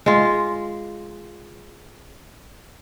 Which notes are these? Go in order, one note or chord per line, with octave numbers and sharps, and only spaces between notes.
G#3 F4